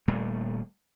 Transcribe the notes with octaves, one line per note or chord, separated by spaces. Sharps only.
D#1 A#2 G3 A3